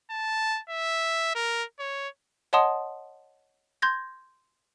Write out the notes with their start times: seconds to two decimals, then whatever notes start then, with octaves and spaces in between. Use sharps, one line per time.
0.11 A5
0.70 E5
1.35 A#4
1.79 C#5
2.53 C#5 D#5 F#5 A5 C6 D#6
3.82 C6 G6 G#6 A#6